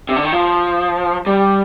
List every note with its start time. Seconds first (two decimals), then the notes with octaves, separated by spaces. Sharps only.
0.09 C3
0.16 D3
0.24 D#3
0.32 F3
1.26 G3